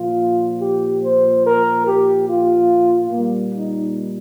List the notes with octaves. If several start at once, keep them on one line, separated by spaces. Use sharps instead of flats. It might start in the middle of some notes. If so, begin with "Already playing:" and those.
Already playing: A#2 F3 F4
G4
C5
A#4
G4
F4
A#2 G3 A#3
D#4